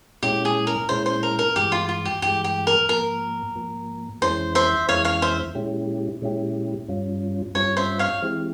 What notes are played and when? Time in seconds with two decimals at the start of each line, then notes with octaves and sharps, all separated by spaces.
0.23 A#2 G#3 C#4 E4 G4
0.45 G#4
0.67 A#4
0.89 A#2 G#3 C#4 E4 C5
1.06 C5
1.23 A#4
1.39 A#4
1.56 G2 E3 G#3 G4
1.72 F4
1.89 F4
2.05 G4
2.22 G2 E3 G#3 G4
2.44 G4
2.67 A#4
2.89 G#2 F3 A#3 A#4
3.56 G#2 F3 A#3
4.21 F2 E3 G#3 C#4 E4 C5
4.55 C5 E5
4.89 F2 E3 G#3 C#4 E4 C#5 F5
5.05 C#5 F5
5.22 C5 E5
5.55 A#2 G#3 C#4 E4 G4
6.22 A#2 G#3 C#4 E4 G4
6.88 G2 G3 C#4 F4
7.55 G2 G3 C#4 F4 C#5
7.77 C5 E5
7.99 C#5 F5
8.22 E3 G#3 C4 E4 G4